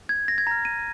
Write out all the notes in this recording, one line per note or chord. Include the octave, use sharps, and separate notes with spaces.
G#6
A#6
G#6
A#5 F6 A#6
D#7